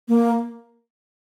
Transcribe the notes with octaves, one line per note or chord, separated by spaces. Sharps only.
A#3